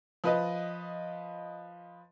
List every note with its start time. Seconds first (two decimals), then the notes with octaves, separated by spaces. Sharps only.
0.24 F3 B4 D#5